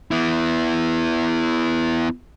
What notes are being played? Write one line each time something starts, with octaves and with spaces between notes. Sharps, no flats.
B3 E4